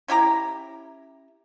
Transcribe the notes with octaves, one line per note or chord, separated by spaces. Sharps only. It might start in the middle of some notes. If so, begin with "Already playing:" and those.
C#4 E4 G4 A#5